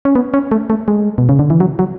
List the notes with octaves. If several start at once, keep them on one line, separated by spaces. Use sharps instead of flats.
C#4
B3
C#4
A3
A3
G#3
B2
C#3
D3
E3
F#3
F#3